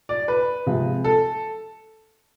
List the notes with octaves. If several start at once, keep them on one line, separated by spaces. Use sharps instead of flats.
D5
B4
C3 F3 G#3
A4